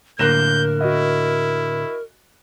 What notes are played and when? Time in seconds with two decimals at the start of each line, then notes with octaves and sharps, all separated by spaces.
0.19 A2 D3 A#3 A#4 F#6 G6 A#6 E7
0.81 E4 F#4 D#5